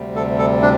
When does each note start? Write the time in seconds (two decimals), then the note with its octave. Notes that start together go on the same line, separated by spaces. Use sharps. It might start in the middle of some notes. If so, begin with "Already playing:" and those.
Already playing: D2 C3 G3
0.16 A4
0.39 A4
0.62 D4